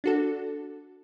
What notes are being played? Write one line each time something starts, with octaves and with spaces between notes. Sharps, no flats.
D4 F#4 A4